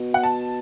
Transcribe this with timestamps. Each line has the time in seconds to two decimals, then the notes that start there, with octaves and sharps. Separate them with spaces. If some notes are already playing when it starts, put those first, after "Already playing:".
Already playing: B2
0.14 F#5
0.23 A5